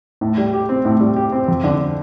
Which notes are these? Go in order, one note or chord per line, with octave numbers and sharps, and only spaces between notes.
A2
G3
G4
C4
A2
G3
G4
C4
F2
D3